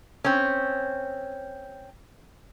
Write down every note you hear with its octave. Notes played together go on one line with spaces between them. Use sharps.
C4 C#4